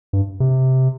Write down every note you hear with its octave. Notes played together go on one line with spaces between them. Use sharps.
G2
C3